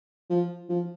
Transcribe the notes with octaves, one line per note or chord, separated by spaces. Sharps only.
F3
F3